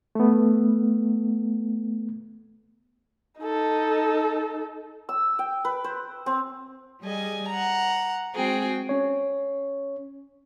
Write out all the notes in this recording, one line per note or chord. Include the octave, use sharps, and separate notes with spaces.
A3 B3
D#4 A4
E6
G5
B4
C5
C4
G3 G#4 D#5 G#5
F#5 A#5
G#3 C4 F#4 G#4 G5
C#4 C#5